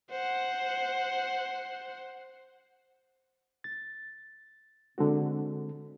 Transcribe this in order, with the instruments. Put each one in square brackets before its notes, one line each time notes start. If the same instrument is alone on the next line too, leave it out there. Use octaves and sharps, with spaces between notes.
[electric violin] C5 F#5
[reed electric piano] A6
D3 G#3 C4 F#4